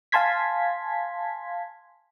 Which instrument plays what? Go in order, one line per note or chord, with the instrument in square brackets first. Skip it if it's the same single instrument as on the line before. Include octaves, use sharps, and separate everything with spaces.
[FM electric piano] F5 G#5 A5 C6 G#6 B6